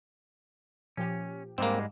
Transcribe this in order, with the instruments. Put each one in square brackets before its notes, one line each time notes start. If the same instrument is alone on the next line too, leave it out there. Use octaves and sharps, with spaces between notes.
[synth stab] A#2 F3 G4 [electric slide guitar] C#4
[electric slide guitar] G#2 G3 G#3 [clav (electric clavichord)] A#3 C4